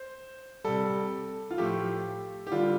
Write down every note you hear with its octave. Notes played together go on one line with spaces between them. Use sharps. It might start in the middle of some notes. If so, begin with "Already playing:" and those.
Already playing: C5
C3 G3 A4
F4
A2 F3 A3 G4
G4
D3 G3 F4